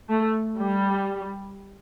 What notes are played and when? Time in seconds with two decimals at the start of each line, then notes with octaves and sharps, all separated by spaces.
0.09 A3
0.60 G3